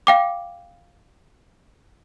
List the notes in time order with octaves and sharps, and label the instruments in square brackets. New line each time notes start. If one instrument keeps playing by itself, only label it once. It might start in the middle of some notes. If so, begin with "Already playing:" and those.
[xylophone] F5 G5 D6